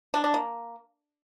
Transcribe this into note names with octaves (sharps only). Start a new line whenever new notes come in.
D4
D4
A#3